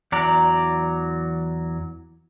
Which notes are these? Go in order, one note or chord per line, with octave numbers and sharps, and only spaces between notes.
E2 F#3 D5 A#5